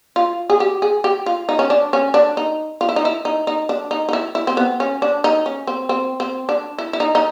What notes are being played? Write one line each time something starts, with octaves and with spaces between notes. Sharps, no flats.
F4
G#4
G4
G#4
G4
F4
D#4
C#4
D4
C#4
D4
D#4
F4
E4
D#4
E4
D#4
D#4
D4
D#4
D#4
E4
E4
C4
B3
C#4
D4
D#4
C#4
C4
C4
C4
D4
E4
E4
D#4
D#4